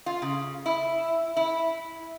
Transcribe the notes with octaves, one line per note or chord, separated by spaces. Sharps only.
F4
C#3
E4
E4